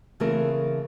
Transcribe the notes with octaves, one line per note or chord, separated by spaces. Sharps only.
C#3 E3 A3 C4 G#4 A#4